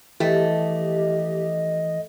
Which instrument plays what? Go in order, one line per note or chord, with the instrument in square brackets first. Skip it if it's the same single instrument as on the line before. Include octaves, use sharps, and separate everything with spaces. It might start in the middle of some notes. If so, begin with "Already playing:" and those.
[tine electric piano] E3 [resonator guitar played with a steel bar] A3 [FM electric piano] G4 [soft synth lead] D#5